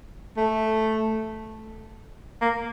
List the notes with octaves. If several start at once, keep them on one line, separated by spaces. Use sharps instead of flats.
A3
A#3